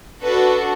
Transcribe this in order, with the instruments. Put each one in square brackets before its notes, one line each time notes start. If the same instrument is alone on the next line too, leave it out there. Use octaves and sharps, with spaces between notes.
[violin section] D4 F#4 A4 B4